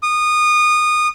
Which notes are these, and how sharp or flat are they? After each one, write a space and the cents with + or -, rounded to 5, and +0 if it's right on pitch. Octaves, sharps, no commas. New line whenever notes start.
D#6 -25